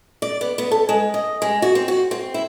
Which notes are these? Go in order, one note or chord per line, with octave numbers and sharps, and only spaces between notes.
D5
B3
B3
A4
G#3
D#5
G#3
F#4
C4
F#4
C4
E4